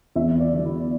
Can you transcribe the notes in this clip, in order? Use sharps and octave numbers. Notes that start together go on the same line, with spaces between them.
E2 E5
D5
D3 F#3
E4